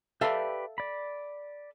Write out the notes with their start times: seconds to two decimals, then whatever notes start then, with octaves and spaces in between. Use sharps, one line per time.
0.21 G4 A4 B4 D5 E5 F5
0.78 D5 B5